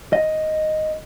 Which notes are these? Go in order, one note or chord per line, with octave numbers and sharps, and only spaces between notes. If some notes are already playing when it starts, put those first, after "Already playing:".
D#5